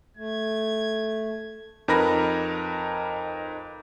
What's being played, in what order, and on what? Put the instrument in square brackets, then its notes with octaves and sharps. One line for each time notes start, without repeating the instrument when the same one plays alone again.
[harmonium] A3 [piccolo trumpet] G#6
[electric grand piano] F2 D#4 A#4 B4 B5 A#6